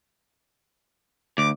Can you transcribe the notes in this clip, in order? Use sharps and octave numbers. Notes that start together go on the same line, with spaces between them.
D2 D6